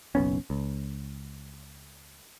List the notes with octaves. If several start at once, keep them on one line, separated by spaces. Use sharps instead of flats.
F#1 B1 B3 C#4
C#2